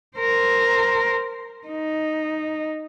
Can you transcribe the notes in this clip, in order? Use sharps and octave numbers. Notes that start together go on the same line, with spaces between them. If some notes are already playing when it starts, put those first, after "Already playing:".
A#4 C5
D#4